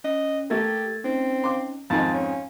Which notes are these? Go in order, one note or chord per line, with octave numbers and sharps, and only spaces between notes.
C#4 D#5
A3 A#3 G4 A4 G#6 A6
C4 C#4 D#4
C6 D6
F2 G#2 D#3 F5 G#5 A5
C#4